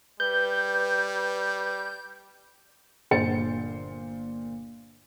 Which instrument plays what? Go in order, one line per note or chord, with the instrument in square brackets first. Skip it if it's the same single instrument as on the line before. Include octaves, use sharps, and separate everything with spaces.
[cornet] G3 [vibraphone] B4 [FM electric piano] G6
[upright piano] G1 A#2 C5 A6 C#7